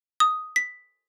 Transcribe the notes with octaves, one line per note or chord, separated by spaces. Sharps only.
D#6
B6